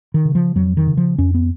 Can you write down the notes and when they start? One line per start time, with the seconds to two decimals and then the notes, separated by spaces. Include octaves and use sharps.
0.14 D#3
0.25 C#3
0.35 F3
0.55 F2 F#3
0.77 D#3
0.87 C#3
0.97 F3
1.18 F2 C#4
1.34 B3